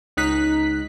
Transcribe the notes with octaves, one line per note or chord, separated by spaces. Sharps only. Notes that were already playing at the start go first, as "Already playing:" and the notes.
C#2 D#4 F#6 B6